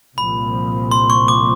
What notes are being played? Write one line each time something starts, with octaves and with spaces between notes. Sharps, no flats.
C2 A#2 F3 B5
C6
C#6
D6